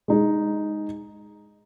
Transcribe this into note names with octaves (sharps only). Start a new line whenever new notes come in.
G#3 D#4 G#4